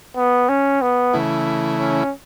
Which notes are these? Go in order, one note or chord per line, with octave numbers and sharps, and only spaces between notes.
B3
C#4
B3
C#3 E3 A3 E4
C#4